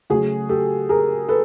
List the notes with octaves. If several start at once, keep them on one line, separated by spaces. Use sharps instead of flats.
C#3 F#3 A3 F#4 G#4
G4 A4
G#4 A#4
A4 B4